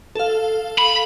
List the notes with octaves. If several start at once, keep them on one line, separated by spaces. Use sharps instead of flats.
A4 F5
B5